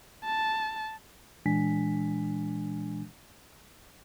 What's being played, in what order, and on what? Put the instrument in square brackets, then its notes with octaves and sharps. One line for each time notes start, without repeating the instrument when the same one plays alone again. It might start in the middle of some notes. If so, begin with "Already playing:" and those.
[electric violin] A5
[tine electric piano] A#2 E3 G#3 D4 G#5 B6